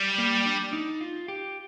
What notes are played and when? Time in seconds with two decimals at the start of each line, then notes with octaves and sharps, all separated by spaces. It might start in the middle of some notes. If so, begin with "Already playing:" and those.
Already playing: G3
0.18 A#3
0.46 D4
0.73 D#4
1.01 F4
1.28 G4